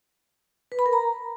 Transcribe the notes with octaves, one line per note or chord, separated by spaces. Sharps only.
B4
B5
A#4
A#5